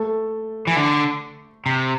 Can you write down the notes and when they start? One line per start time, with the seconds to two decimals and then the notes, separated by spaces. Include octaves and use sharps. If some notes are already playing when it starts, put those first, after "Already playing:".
Already playing: A3 A4
0.67 E3
0.76 D3
1.66 C3